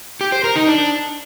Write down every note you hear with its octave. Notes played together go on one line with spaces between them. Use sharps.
G4
C5
A#4
D#4
D4